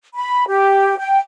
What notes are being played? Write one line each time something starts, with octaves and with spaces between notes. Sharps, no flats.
B5
G4
G5